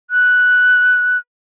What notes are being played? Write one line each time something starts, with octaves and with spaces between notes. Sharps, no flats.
F#6